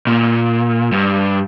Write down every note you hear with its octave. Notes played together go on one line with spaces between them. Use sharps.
A#2
G2